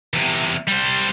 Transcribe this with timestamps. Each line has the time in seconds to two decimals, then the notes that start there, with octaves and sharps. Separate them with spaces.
0.13 E2 C3
0.67 G3 C5